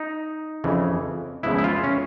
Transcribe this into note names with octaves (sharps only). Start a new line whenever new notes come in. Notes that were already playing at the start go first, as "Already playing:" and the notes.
Already playing: D#4
F2 C#3 E3
E2 C#3 F3 G#3 B3 E4
E4
F4
C#4